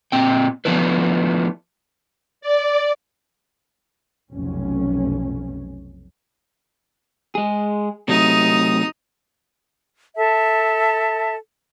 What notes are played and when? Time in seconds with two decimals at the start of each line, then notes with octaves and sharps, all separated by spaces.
0.12 A#2 C4 G5
0.65 F3 A3 B3 D4 E4 B4
2.41 D5
4.33 F1 B1 C#4
7.35 G#3 G#4
8.08 C3 F#3 A3 D#4 D#6
10.16 A4 E5 A5